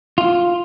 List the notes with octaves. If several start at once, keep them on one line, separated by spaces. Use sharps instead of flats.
F4